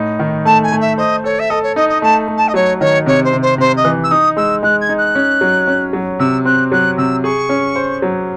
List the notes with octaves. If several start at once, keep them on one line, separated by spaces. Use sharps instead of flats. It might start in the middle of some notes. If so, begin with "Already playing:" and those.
Already playing: A2 D#4
D#3
A3 A5
G#5
A3
E5
C5 D#5
A4 C#5
E5
A4 D#5
C#5
D#4 D#5
D#5
A3 A5
A3
A5
D#5
F#3 C#5
D#3 C#5
C3 C#5
C5
C3
C5
C3 C5
D#5
E3
E6
D#4 D#6
G#3 E6
G#3 F#6
G#6
D#4
F#6
C#4
F#3
C#4
F#3
C3 E6
C4 F#6
F#3 F#6
C3 E6
G#4 C#6
C#4
C5
F#3